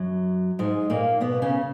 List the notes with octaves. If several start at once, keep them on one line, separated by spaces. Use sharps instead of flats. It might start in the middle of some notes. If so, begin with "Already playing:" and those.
Already playing: F#2 F#3
G#2 G#3
A#2 A#3
B2 B3
C#3 C#4